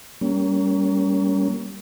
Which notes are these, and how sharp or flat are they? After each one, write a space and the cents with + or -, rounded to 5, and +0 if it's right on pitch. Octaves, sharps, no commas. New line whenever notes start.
G3 +0 A#3 +0 C#4 +25